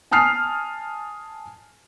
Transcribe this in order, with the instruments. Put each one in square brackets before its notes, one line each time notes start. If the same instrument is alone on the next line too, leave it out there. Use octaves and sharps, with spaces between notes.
[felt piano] G#5 A5 D#6 F6 C7